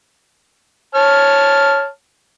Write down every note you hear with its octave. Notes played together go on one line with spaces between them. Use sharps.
C#5 A5 F6